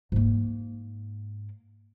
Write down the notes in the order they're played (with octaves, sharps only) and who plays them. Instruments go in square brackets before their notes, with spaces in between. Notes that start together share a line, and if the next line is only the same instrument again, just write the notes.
[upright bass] G#2 A#3